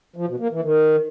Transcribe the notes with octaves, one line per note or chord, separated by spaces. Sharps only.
F3
B2
A#3
E3
D#3